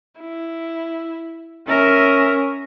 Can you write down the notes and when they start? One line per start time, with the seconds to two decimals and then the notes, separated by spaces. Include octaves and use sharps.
0.20 E4
1.68 C#4 A#4 E5